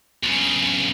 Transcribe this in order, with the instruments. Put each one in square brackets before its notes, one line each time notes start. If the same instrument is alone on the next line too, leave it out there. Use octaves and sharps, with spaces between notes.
[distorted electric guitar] B1 C#3